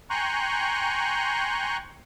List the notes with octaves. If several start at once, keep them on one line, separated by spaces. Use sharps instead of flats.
G5 G#5 A#5 C6 C#6 F#6